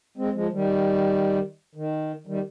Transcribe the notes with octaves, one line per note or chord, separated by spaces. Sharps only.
G#3 C4
F3 G#3
D#3 G3
D#3
D#3 G3